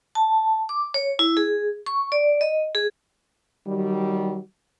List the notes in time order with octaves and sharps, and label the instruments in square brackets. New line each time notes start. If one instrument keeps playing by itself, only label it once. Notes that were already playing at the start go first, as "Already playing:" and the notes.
[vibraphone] A5
D6
C#5
E4
G#4
C#6
D5
D#5
G#4
[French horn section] D#3 F#3 G3